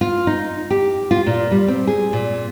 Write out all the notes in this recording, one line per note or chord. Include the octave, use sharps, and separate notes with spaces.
F4
D#4
G4
F4
A#2
G3
C4
G#4
A#2